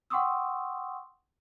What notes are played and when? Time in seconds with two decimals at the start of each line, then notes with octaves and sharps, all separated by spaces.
0.10 F#5 G5 C6 C#6 D#6 E6